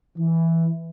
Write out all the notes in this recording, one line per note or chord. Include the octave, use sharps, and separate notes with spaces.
E3